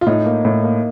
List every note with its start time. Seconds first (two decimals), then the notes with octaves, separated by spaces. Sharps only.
0.01 F4
0.06 A2 D#4
0.26 A#3
0.45 A2
0.64 A#3